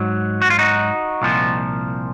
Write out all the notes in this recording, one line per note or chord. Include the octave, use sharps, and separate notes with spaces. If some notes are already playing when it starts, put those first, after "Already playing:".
Already playing: G#2 F#3
F#4
F4
D#4 F#4
C2 A#2 F3